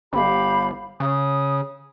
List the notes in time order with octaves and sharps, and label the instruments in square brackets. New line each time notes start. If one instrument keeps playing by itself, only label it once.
[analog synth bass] G1 [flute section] G4 F5 B5
[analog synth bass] C#3 [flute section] D#6